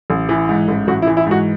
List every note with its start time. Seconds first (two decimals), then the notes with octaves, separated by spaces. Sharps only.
0.10 A1
0.29 E3
0.49 G#2
0.68 A1
0.87 A1 F#4
1.02 E4
1.07 E3
1.17 E4
1.27 G#2 F#4